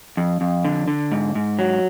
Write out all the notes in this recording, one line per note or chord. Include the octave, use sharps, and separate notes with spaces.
F2
F2
D3
D3
G#2
G#2
F#3